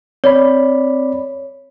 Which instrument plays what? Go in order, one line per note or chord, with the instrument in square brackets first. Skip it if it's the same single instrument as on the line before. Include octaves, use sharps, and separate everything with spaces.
[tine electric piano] C4 D5 B5 [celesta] C#5